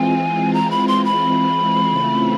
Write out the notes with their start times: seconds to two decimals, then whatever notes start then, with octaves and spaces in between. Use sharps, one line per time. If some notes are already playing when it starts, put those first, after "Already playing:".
Already playing: E3 G#3 C4 F4 G#5
0.53 A#5
0.71 B5
0.88 C6
1.05 B5
1.89 C#3 E3 A3 C4 F4